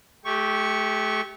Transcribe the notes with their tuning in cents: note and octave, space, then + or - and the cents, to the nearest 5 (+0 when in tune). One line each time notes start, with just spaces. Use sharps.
A3 -35 G4 +0 C#6 +0